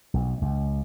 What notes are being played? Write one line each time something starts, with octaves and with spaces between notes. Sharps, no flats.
B1
C#2